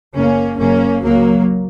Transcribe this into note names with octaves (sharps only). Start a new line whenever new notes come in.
F#1 F#2 C#3 A#3 C#4
F#1 F#2 C#3 A#3 C#4
C#2 C#3 F#3 A#3